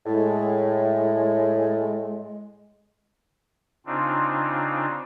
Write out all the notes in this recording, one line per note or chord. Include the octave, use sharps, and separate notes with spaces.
A2 G#3
C#3 C4 D4 D#4 F4